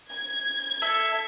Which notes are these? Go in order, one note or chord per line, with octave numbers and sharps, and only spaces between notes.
G#6
A4 E5